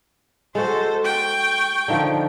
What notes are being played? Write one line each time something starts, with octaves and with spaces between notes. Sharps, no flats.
G#3 F#4 A4 C5
G5 C#6
D3 D#3 F3